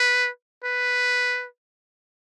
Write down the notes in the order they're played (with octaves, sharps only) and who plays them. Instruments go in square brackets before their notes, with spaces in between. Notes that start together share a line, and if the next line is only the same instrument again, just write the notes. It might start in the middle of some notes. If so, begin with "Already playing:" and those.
Already playing: [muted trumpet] B4
B4